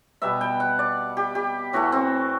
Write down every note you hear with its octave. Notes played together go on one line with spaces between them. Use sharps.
B2 G3 B3 E5
G5
F#5
D5
G4
G4
A2 E3 A3 F#4
C4